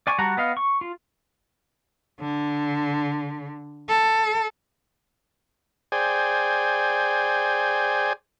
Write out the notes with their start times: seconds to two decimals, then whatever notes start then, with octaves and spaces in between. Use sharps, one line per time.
0.07 D5 G#5 C#6
0.19 G3 F#4 F#5 A5 A#5
0.37 B3 D#5 F5
0.57 C#6
0.81 F4
2.21 D3
3.89 A4
5.92 G#4 C5 D5 G5 G#5